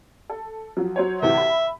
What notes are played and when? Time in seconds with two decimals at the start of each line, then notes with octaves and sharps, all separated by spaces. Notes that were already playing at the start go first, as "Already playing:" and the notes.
0.30 A4
0.77 F3 F#3
0.96 F#3 C5 C#5
1.22 D2 C3 E3 E5
1.37 B5